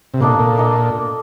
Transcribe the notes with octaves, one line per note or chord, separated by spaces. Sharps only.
C3
A#2 A#3 D4 A4 D#5
A#2
A#3 D4 A4 D#5